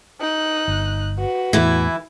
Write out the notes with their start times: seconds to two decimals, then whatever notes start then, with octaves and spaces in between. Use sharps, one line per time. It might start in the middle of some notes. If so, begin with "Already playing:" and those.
0.20 D#4 F#6
0.68 G1
1.18 F#4 B4
1.53 E2 A2 E3 E4